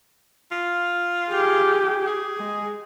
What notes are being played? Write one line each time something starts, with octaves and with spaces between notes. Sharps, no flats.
F4
G4 G#4
G#4
G#3